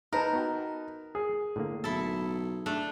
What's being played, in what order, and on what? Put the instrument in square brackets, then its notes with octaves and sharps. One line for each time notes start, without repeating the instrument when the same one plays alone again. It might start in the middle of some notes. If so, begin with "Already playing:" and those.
[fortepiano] D#4 B4 A5 [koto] A#4
[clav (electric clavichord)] B3 F#4 G5
[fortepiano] G#4
[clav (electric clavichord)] A2 D3 A#3
[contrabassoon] B1 [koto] E4 A4
[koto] A3 D4